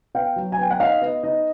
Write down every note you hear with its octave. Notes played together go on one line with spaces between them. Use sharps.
B3 F5 G5
F#3
G#5
B3 G5
F#5
D#4 D#5 F5
B3 D#5
D#4 D#5